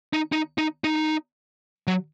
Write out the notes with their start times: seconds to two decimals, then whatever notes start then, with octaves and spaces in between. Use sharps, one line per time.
0.13 D#4
0.32 D#4
0.58 D#4
0.84 D#4
1.87 F#3